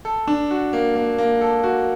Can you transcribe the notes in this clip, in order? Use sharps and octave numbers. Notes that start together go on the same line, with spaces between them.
A4
D4
F#4
A#3
A#3
A#3
A4
F#4